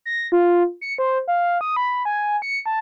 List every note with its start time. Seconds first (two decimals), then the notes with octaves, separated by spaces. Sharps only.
0.06 A#6
0.32 F4
0.81 C#7
0.98 C5
1.28 F5
1.61 D#6
1.76 B5
2.05 G#5
2.42 C#7
2.66 A5